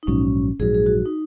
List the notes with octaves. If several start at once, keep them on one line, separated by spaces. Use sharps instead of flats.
D#4
A#1 G#2 F#3 C#4
A#1 G#2 F#3 G#4
G#4
F#4
D#4